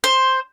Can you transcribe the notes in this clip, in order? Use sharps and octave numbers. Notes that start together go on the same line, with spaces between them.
C5